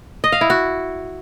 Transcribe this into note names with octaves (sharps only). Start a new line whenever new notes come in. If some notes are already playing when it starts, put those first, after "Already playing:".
D#5
F5
E4
F#4